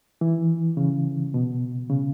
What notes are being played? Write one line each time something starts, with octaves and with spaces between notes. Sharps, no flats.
E3
C#3
B2
C#3